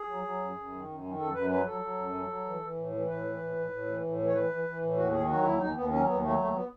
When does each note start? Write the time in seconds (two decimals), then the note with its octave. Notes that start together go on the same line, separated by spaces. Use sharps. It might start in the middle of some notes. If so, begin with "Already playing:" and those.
Already playing: G#4
0.09 F#3
0.24 F#3
0.41 F#2
0.56 F#2
0.72 D#3
0.87 F#2
1.03 D#3
1.19 F#2 A4
1.34 F#2 B4
1.50 F#3 B4
1.66 F#3 A4
1.82 F#3
1.97 F#2
2.13 F#3
2.29 F#3
2.45 E3
2.61 E3
2.76 A2
2.92 E3
3.07 A2 B4
3.23 E3
3.39 A2
3.56 A2
3.70 A2
3.86 E3
4.03 A2
4.18 E3
4.28 C#5
4.34 E3 B4
4.49 E3
4.65 E3
4.81 A2
4.97 D#2 F#4
5.12 D#3 G#4
5.28 F#3 F#4
5.43 D#2 E4
5.59 D#2 D#4
5.75 D#2 B3
5.91 F#3 C#4
6.06 D#2 B3
6.23 F#3 A3
6.38 D#2 A3
6.54 B3